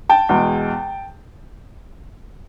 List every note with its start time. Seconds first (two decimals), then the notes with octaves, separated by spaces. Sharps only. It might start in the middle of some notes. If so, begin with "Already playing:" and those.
0.09 G5 A5
0.29 E2 B2 G#3